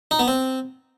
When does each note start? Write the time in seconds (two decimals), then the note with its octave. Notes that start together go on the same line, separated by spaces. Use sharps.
0.11 D#4
0.19 B3
0.28 C4